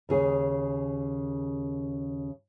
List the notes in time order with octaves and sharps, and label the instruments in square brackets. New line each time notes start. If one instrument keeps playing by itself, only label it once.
[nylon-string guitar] D#2 C#3 G#4